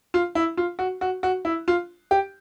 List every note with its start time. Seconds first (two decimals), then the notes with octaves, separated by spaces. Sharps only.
0.14 F4
0.35 E4
0.57 F4
0.79 F#4
1.01 F#4
1.23 F#4
1.45 E4
1.68 F4
2.11 G4